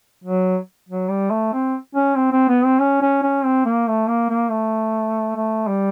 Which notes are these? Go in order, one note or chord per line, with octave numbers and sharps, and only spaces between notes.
F#3
F#3
G3
A3
C4
C#4
C4
C4
B3
C4
C#4
C#4
C#4
C4
A#3
A3
A#3
A#3
A3
A3
G3